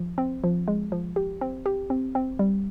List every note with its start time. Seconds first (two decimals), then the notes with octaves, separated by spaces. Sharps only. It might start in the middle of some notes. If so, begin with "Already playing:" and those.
Already playing: F3
0.18 C4
0.44 F3
0.68 G#3
0.92 F3
1.16 G4
1.41 C4
1.66 G4
1.90 C4
2.15 C4
2.39 G3